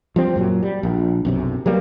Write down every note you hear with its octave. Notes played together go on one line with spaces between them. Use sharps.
F3 G3 C4
F#2 A#2 F#3
G3
A#1
B1 F#2 C3
F#3 G3 A#3 B3